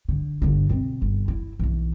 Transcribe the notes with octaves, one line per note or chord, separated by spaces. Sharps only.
D3
G1 D3
B2 C4
G1
E4
B1 E3